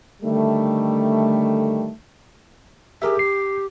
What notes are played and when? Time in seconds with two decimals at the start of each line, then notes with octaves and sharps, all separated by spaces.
0.23 D3 D#3 G3 A3
3.02 G4 G#4 A#4 E5
3.19 C7